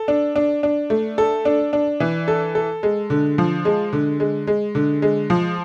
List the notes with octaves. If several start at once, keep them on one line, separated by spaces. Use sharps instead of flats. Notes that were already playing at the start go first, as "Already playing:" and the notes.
Already playing: A4
D4
D4
D4
A3
A4
D4
D4
E3
A4
A4
G#3
D3
F3
G#3
D3
G#3
G#3
D3
G#3
F3